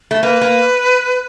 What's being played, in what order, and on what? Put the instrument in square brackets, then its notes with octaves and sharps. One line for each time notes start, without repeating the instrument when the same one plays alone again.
[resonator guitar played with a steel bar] A3
[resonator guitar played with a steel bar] A#3 [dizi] B4
[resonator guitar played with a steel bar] A#3